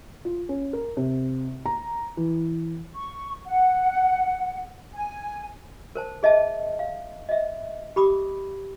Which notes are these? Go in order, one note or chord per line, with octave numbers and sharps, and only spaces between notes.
F4
C#4
A#4
C3
A#5
E3
C#6
F#5
G#5
A#4 C5 A5
G#4 D#5 E5 A5
F5
D#5 E5
G4 B5 D6 D#6